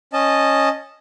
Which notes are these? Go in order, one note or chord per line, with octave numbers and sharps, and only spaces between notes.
C#4 D#5 A5